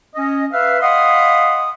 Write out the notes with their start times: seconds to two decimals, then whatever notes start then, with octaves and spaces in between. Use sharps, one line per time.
0.15 C#4 D#5
0.52 B4 E5 F5
0.81 D#5 F5 F#5 B5 C6 D#6